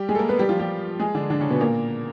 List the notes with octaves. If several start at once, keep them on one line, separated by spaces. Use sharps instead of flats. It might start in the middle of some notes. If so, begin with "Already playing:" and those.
Already playing: G3 G4
G#3 G#4
A4
A#3 A#4
B3 B4
G3 G4
F3 F4
G3 G4
G#3 G#4
D3 D4
D3 D4
C#3 C#4
B2 B3
A#2 A#3